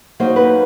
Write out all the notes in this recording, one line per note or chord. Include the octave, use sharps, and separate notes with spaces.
F#3 A#3 D#4 C5
B4